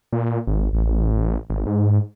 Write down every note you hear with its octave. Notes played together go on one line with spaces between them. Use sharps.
A#2
G#1
A1
G#1
G#2